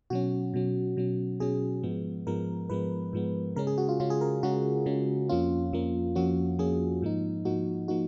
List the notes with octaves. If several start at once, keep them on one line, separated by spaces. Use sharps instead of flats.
B2 F#3 C#4 F#4
B2 F#3 C#4
B2 F#3 C#4
B2 F#3 C#4 G#4
G#2 F3 G#3 B3
G#2 F3 G#3 B3 A#4
G#2 F3 G#3 B3 B4
G#2 F3 G#3 B3
C#3 G#3 C#4 A#4
G#4
F#4
F4
C#3 G#3 C#4 F4
G#4
A#4
C#3 G#3 C#4 F#4
C#3 G#3 C#4
F2 F3 A#3 C#4 F4
F2 F3 A#3 C#4
F2 F3 A#3 C#4 F#4
F2 F3 A#3 C#4 G#4
G#2 F3 A#3 D#4
G#2 F3 A#3 D#4 F#4
F3 A#3 D#4 F#4